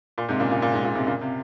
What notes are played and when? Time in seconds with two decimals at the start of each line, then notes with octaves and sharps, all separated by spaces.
0.18 A#2
0.29 G#2 C3
0.40 A#2 C#3
0.51 A#2
0.62 A#2
0.73 G#2
0.84 A#2
0.95 G#2 C3
1.07 A#2 C#3
1.21 C3